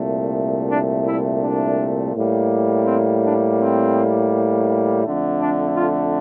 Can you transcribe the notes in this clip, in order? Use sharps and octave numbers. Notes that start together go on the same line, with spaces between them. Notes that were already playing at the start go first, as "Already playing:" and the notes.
Already playing: C2 A#2 A3
D4
E4
D4
A2 G3 A#3
C4
D4
C4
F2 D3 A3
D4
F4